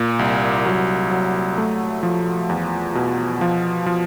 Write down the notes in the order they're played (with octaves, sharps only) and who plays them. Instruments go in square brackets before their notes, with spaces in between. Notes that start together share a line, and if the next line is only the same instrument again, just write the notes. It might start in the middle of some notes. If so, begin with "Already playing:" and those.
Already playing: [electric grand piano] A#2
C2
F#3
F#3
A3
F3
E2
B2
F3
F3